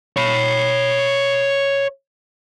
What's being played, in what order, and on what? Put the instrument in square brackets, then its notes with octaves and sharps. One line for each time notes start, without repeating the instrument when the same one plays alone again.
[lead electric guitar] C#5 B5